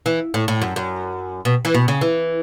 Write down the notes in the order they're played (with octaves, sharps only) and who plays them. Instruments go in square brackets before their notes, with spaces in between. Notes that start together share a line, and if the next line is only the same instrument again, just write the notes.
[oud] E3
A2
A2
F#2
F#2
B2
E3
B2
C#3
E3